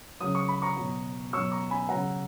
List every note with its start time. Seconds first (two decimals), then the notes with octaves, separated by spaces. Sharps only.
0.21 C#3 F#3 D#6
0.35 C#6
0.48 B5
0.62 A#5 C#6
0.76 B2 F#3
1.33 B2 F#3 C#6 E6
1.52 A#5 C#6
1.70 G#5 B5
1.89 C#3 F#3 F#5 A#5